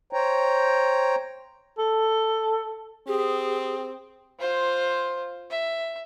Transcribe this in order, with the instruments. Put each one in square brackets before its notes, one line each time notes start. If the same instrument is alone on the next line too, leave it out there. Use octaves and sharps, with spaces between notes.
[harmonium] C5 C#5 G5 A#5
[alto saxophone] A4
[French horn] C4 [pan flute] G4 [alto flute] G#4
[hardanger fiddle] F4 C5
E5